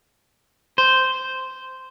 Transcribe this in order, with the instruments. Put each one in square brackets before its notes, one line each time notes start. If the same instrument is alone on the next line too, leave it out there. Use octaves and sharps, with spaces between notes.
[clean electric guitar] C5